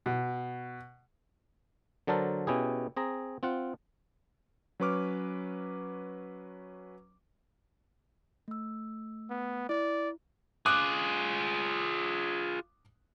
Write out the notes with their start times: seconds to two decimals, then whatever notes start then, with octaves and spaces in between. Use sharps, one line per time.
0.06 B2
2.07 D3 F#3 D4 A4 A#4 C5
2.47 B2 C#4 E4 G4 G#4
2.97 C4 G#4 A#5
3.43 C4 F4 F#5
4.80 F#3 C#4 B4 C#6 D6 F6
8.48 A3 E6
9.30 B3
9.69 E4 D5
10.66 F4 G#4 D6 D#6 F#6